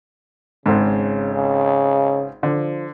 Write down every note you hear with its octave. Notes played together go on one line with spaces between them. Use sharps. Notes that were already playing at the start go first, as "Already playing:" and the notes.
G#1 G#2 C#3
C#3
D3 F3